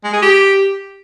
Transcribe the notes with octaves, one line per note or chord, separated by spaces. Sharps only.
G#3
G#4
G4